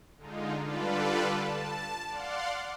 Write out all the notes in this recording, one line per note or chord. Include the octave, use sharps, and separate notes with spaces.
D3 G#3 D#4 F4
D3 G3 F4 A4 B4 D5
A5
D5 F5 F#5 C6